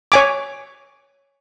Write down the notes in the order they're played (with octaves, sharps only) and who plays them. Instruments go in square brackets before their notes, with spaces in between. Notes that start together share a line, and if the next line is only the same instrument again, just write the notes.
[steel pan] C#5 G#5 D6